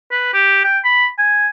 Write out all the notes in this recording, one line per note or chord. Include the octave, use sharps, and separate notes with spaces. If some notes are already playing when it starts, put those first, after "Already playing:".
B4
G4
G5
B5
G#5